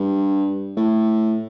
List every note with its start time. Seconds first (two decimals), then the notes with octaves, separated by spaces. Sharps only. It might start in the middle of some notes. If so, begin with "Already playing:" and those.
Already playing: G2
0.77 A2